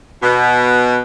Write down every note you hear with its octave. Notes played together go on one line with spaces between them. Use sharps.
B2